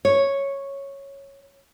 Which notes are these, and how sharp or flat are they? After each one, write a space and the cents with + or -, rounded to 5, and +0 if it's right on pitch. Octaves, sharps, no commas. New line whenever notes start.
C#5 -5